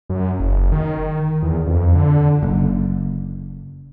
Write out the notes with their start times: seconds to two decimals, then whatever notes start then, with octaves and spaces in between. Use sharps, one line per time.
0.09 F#2
0.40 F#1
0.72 D#3
1.42 E2
1.66 F2
1.95 D3
2.43 F#1